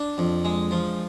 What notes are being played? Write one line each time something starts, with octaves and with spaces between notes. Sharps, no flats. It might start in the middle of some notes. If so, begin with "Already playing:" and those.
Already playing: D4
F2
G#3
F3